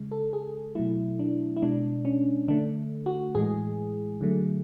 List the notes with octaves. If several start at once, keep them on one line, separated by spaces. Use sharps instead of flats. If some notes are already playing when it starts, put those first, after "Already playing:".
Already playing: C#3 G#3
A4
G#4
B2 F#3 A3 E4
D4
E4
B2 G#3 D4
C#4
D3 A3 D4
F#4
A2 E3 G#3 G#4
D3 F#3 A3